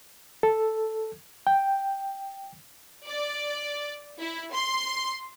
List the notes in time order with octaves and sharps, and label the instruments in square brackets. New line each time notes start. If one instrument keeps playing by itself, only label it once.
[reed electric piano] A4
G5
[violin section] D5
E4
C6